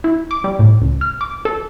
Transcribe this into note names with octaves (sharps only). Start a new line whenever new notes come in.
E4
D6
G3
A2
C#2
F6
D6
A4